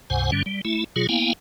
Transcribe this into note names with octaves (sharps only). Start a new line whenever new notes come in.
C#2 G2 C3 C5 F#5 G#5
G2 D3 G3 C#4
G3
A3 E4
B2 F#3 F4 G#4
A#3 B3 E4 F5 G5 G#5